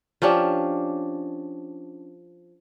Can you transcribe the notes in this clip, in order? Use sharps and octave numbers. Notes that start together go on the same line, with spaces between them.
F3 C#4 D4 G4